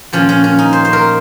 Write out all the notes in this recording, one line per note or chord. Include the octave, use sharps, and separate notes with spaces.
A#2 F3 C#4
C#4
C#4
D#4
C5
C5
A#4